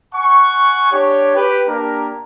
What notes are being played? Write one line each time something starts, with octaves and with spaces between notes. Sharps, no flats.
F#5 G#5 C#6
D4 G4 C#5
G4 B4
A#3 D4 G4 A#4 A#5